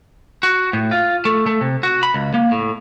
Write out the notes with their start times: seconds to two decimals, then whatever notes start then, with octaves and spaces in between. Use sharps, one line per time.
0.43 F#4
0.73 A2
0.91 F4
1.25 A3
1.46 A3
1.61 C3
1.83 F#4
2.03 B5
2.14 C#2
2.34 A#3
2.51 A2